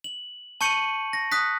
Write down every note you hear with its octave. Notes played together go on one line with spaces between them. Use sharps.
F#7
A5 C#6 G6 C#7 D#7 F#7
A#6
D#6 F#6 B6